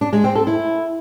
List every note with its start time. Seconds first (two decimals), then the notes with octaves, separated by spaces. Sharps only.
0.01 D4
0.13 G#3
0.24 C4
0.35 A4
0.47 E4